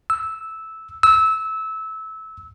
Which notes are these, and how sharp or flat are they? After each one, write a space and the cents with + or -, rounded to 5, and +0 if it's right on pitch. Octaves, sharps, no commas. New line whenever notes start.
E6 -10
E6 -20